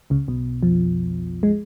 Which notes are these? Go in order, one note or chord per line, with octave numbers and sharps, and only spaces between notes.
C#2 C#3
B1 B2
F2 F3
G#3